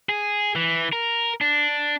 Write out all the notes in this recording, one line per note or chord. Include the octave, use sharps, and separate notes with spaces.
G#4
E3
A#4
D4